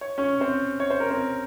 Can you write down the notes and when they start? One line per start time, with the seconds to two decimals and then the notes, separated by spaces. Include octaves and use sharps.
0.01 C#5
0.18 C#4 C#5
0.40 C4 C5
0.80 C#5
0.90 C5
1.00 A#4
1.10 C4 C5